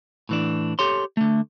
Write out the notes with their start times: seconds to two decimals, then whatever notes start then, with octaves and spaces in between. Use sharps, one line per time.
0.29 A2 E3 D4
0.79 G4 A4 C#5 C6
1.17 D3 A3